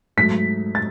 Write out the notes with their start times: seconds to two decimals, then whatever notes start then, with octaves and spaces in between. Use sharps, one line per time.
0.17 G#2 F#3 A3 B6
0.75 A6